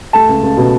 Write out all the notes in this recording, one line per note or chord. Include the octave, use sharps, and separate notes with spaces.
A3 A5
C#2
C#2
B2